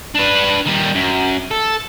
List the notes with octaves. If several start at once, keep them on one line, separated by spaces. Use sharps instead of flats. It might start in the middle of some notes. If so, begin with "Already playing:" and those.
D4 B4
D#3 G3
F#2
A4